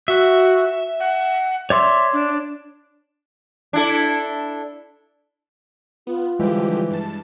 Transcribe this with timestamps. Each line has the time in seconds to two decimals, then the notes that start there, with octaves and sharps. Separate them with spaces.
0.08 F#4 E5
1.00 F#5
1.70 C#5 D5 E5 C6
2.13 D4
3.73 D4 E4 A4
6.07 B3 F4
6.40 D3 E3 F3 G3 G#3 G4
6.91 G2 A5